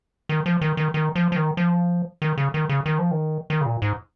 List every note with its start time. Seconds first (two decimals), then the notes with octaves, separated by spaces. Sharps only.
0.29 D#3
0.46 F3
0.61 D#3
0.77 D#3
0.94 D#3
1.15 F3
1.32 F3
1.36 D#3
1.57 F3
2.22 D#3
2.38 C#3
2.54 D#3
2.69 C#3
2.86 D#3
2.99 F3
3.11 D#3
3.50 D#3
3.61 C#3
3.66 A#2
3.82 G#2